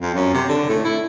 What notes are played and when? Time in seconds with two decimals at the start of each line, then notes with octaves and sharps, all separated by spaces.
0.02 F2
0.14 F#2
0.33 C3
0.49 D3
0.69 A2
0.85 E4